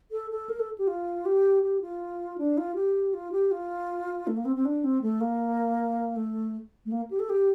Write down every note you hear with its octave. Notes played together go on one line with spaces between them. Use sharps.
A4
A4
A#4
A4
G4
F4
G4
G4
F4
D4
F4
G4
F4
G4
F4
A3
A#3
C4
C4
D4
C4
A3
A#3
A3
A3
A#3
G4
A4
G4